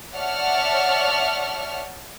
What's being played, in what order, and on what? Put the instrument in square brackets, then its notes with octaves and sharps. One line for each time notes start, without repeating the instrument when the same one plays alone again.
[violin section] C#5 D5 E5 F#5 A5 F6